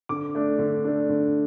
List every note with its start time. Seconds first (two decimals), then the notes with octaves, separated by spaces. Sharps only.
0.09 D3 D6
0.35 A3 D4
0.59 D3
0.84 A3 D4
1.09 D3